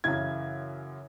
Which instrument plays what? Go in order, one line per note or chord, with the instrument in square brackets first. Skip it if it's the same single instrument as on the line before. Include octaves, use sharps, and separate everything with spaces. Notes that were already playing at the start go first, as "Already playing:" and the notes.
[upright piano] F#2 C#3 E3 G#6